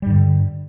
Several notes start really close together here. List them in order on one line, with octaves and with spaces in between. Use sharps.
G3 G2 D3